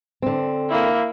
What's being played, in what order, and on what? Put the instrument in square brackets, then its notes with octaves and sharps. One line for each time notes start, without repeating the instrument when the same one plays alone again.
[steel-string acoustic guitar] D3 C4
[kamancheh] A#3 E4